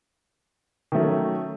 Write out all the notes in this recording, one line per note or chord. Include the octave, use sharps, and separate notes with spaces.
D#3 F#3 A3 C#4